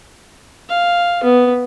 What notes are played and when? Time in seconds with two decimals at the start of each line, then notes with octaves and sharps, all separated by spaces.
0.69 F5
1.24 B3